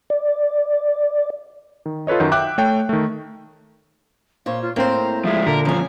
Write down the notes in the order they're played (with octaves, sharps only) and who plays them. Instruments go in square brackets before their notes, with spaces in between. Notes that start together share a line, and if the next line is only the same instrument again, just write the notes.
[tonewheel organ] D5
[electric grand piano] D#3
F4 A4 B4 C#5 D#5
F#2 D#3 F#5 G6
E5 G5 D6 F#6
A3 C#5 G5
D#3 A3
[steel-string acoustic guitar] A#2 C5 C#5 [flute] F5
[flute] F4
[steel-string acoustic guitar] A2 C5 [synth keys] A#3 C4 [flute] A#5
[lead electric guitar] F3 G#3 [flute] E5
[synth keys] A#2 D3 [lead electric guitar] A#4
[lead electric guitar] D#2 F3 [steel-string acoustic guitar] C#4 G#5 [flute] A#5